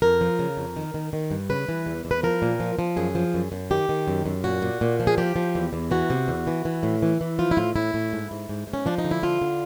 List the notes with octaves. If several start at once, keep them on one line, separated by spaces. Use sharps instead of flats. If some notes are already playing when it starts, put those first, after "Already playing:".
F2 A#4
F3
C#3
F2
D#3
D#3
D#3
G2
C#3 B4
E3
E2
E2
B4
F3 A#4
A#2
F3
F3
F#2 G#4
F3
F#2
F#2
D#3 G4
D#3
F#2
F#2
A#2 F#4
A#2
A#2
F3
G#4
F3 G4
F3
E2
E2
E3 F#4
C3
E2
E3
E3
A2
E3
E3
F3 F4
E4
A2 F4
A2 E4
A2
G#2
G#2
G#2
G#2
C#4
F3 D4
D#4
D3
E4
F3 F4
D3